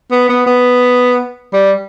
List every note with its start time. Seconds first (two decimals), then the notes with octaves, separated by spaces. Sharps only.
0.11 B3
0.29 B3
0.46 B3
1.53 G3